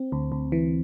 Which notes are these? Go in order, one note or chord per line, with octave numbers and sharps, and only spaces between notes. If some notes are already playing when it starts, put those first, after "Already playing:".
Already playing: C4
D2
D2
E3